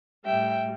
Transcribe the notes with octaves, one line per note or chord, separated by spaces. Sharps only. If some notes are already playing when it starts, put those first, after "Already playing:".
A2 G3 E5 G5